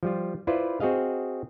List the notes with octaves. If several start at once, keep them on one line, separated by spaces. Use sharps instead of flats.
F3 G3 F4
E4 F4 B4 C5 D5
C4 F#4 G#4 D#5 F5